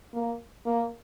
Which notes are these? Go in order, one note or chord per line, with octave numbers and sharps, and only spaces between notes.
A#3
A#3